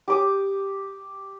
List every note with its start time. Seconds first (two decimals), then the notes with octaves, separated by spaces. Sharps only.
0.08 G4 D6 D#6